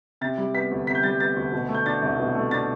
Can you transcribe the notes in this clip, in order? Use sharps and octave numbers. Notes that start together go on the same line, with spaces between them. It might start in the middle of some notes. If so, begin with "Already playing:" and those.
C3 A6
G3
B3 B6
D2
C3 B6
G6
G3 A6
B3 A6
D2
B2
A3
G6
D4 A6
C2
B2
A3
D4 A6